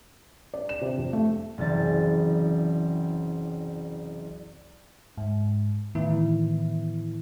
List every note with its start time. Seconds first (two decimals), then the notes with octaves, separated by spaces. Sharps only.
0.54 D5
0.69 E7
0.81 C3
0.98 F2
1.13 A3
1.58 F#1 C2 E3 A6
5.17 G#2
5.95 A2 D#3 E3 B3 E4